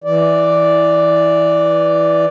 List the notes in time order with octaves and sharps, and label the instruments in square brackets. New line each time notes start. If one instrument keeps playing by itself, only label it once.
[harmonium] E3 D5